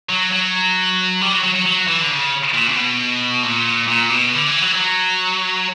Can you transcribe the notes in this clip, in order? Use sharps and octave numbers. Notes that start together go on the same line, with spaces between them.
F#3
F#3
G3
F#3
F#3
F#3
F#3
E3
D3
C#3
A#2
C#3
B2
A#2
A#2
B2
D3
E3
F#3
E3
F#3